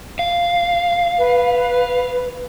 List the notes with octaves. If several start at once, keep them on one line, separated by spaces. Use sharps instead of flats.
F5
B4